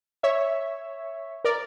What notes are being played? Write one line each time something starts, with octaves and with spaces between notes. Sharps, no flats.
C#5 E5
A#4 D5